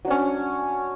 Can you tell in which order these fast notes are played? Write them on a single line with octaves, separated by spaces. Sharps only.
F#3 D4 C#4